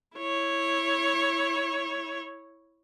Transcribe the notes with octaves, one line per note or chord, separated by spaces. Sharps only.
E4 C#5